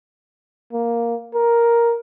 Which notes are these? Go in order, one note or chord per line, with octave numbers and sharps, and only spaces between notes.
A#3
A#4